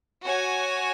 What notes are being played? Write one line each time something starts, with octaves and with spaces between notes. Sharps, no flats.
F#4 C#5 G#5